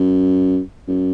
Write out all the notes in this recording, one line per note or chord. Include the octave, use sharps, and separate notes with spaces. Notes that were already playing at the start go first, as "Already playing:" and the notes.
Already playing: F#2
F#2